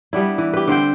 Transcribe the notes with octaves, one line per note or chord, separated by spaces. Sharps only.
G3 B3 D4 E4
E3
G4 B4
D3 C4 C5 G5